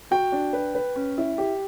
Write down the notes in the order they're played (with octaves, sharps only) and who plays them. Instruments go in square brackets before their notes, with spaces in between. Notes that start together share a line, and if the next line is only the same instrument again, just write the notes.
[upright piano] F#4 [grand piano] G5
[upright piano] D4
B4
B4
C#4
E4
G4